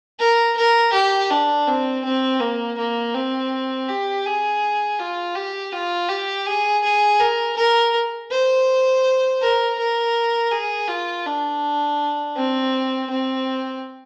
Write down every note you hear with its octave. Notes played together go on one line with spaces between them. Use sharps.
A#4
A#4
G4
D4
C4
C4
A#3
A#3
C4
G4
G#4
F4
G4
F4
G4
G#4
G#4
A#4
A#4
C5
A#4
A#4
G#4
F4
D4
C4
C4